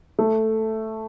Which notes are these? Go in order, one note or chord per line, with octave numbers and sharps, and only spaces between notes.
A3